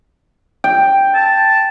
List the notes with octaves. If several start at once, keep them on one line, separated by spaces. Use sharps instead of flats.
G5
A5